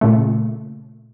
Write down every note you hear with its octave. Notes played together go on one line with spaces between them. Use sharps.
A#2 C#3 A3